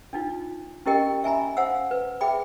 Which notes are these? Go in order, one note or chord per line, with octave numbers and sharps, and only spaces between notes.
D4 D#4 F4
C#4 E4 G4 A#4 D#5 G5
E5 G#5 A#5 B5
C5 F5 F#5 E6
B4
G#4 E5 G5 B5 D6